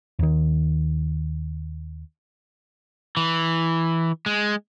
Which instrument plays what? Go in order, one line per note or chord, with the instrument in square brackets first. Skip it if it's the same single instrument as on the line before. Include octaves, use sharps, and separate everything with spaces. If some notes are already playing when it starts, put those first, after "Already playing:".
[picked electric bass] D#2 D#3
[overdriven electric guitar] E3
G#3